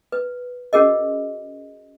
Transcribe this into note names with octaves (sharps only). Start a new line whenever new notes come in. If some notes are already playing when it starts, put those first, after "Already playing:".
B4
C#4 F#4 G#4 A#4 D#5